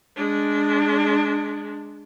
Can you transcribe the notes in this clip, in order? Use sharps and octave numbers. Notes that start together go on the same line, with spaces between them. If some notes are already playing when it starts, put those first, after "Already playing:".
G#3 D4